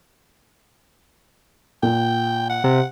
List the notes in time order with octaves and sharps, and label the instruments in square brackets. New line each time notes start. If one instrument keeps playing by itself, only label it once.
[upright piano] A#2 [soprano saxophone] G5
[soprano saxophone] F#5
[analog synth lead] C3